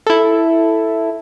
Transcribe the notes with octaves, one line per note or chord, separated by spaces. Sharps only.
E4 A4